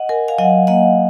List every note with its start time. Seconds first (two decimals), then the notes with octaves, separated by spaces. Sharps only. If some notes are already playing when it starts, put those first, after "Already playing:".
Already playing: D#5 F#5
0.09 A#4 G#5
0.28 F5 G#5
0.38 F#3 D#5 F#5
0.67 A#3 D#5 F#5